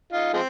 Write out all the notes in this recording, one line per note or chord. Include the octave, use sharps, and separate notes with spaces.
D#4 F4
F3 G#3 C4